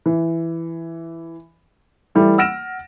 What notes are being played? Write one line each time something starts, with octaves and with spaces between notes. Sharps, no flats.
E3
E3 G3 A3 E4
F#5 E6 F6 A#6 D7 E7